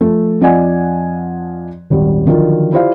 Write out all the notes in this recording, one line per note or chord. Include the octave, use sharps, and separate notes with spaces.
F3 A3
F2 F3 D5 D#5 F#5 G#5
D#1 G#1 G3
D3 D#3 F3 F#3 F4
E4 F4 G4 C5 D5 F5